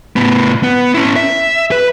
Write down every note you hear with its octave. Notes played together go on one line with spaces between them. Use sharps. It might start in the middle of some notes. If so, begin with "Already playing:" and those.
A2 B3
B3
C#4 E4
E5
B4